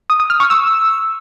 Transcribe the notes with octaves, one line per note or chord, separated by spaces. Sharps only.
D#6
D#6
F6
C#6
E6